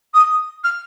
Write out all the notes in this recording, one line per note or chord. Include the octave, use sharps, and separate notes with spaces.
D#6
F6